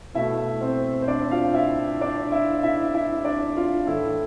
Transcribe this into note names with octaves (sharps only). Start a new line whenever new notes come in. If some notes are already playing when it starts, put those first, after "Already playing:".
B2 A3 E4 E5
C4 C5
C5
D4 D5
F4 F5
E4 E5
D4 D5
E4 E5
E4 E5
E4 E5
D4 D5
F4 F5
A2 E3 A3 E4 E5